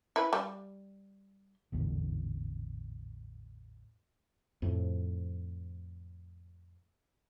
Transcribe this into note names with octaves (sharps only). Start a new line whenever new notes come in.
E4 B4
G3
A1 E2 G#2 D3
F2 A2 F3